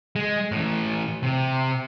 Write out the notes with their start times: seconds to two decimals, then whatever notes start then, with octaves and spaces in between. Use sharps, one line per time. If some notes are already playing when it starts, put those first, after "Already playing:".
0.16 G#3
0.52 A2 E3
1.23 C3